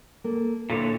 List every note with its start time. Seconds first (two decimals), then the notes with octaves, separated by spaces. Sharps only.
0.24 A#3 A4 A#4
0.70 A#2 D3 E4 A4 C#5